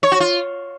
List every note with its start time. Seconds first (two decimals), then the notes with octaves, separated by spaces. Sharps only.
0.03 C#5
0.12 F#4
0.20 F4